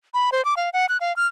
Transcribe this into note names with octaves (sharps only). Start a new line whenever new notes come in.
B5
C5
D6
F5
F#5
F#6
F5
F6